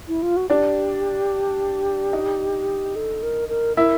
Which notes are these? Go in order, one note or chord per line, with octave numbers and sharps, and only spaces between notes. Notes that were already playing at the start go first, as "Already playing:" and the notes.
E4
F4
F#4
D4 G4 D5
D#4 D#5
A4
A#4
A#4
E4 A#4 E5